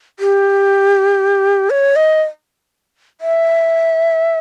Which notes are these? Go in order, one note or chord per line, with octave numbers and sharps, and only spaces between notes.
G4
C#5
D#5
E5